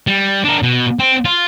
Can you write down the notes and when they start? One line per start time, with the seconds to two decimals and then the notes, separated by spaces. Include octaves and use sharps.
0.07 G3
0.44 D4 A#4
0.63 B2
0.99 C4
1.25 F4